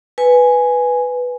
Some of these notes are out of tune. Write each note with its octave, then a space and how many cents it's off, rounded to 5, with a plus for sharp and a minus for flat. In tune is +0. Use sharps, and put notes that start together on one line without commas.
B4 +0 G#5 +0